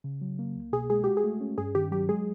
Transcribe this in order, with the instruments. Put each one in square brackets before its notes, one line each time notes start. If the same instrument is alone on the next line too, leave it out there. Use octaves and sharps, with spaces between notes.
[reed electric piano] C#3
F#3
A#3
C2
[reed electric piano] B2 [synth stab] G#4
[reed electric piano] G#3 [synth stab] G#4
[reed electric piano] F#4 [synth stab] G4
[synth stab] G#4
[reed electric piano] A3
C#4
[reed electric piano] G2 [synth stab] G#4
[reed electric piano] D#3 [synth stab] G4
[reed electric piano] F#3 [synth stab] G4
[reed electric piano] G#3 [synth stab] G#4